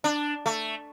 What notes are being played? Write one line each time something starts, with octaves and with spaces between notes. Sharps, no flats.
D4
A3